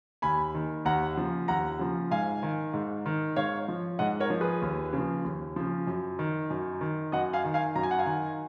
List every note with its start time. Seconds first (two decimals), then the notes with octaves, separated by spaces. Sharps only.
0.22 D#2 G#5 B5
0.55 D#3
0.85 D#2 F#5 A#5
1.17 C#3 F3
1.48 D#2 F#5 A#5
1.79 C#3 F3
2.11 G#2 F5 G#5
2.43 D#3
2.73 G#2
3.06 D#3
3.36 G#2 C#5 F5
3.68 F3
3.99 G#2 D#5 F#5
4.20 A#4 C#5
4.30 F3
4.41 G#4 B4
4.62 D#2
4.93 C#3
4.98 F3
5.24 D#2
5.56 C#3 F3
5.87 F#2
6.19 D#3
6.50 F#2
6.81 D#3
7.12 F#2 D#5 F#5
7.33 F5 G#5
7.45 D#3
7.54 F5 G#5
7.75 F#2 A#5
7.83 G#5
7.91 F#5
7.98 F5 G#5
8.06 D#3